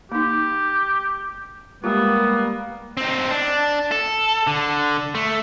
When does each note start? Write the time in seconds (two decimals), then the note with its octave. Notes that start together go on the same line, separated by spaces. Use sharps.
0.12 A#3 D#4 G4
1.84 G3 G#3 A#3 B3 F4
2.97 C4 D#4
3.31 D4
3.91 A4
4.47 D3
5.15 A3